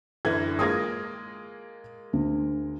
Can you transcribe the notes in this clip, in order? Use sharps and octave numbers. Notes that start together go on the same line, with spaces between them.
F#2 D3 E3 G#6
G#3 A#3 F4 D#6 G#6 A#6
D2